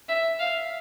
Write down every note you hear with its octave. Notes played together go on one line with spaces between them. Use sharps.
E5
F5